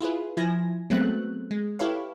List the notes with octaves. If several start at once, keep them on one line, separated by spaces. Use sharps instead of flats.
E4 F4 G#4 B4
F3 E4 G#5 A#6
F#3 G#3 A3 B3 C4 F#6
G#3
E4 G4 A4 B4 C#5 F5